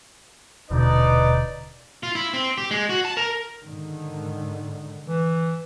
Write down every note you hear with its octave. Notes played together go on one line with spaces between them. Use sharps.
D#1 B2 D3 D#4 B4 D5
F4
E4
C4
G4
G#3
F#4
A5
A#4
G#2 D3 D#3
E3